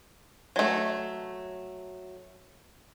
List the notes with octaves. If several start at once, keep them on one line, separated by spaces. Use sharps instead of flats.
F#3 A3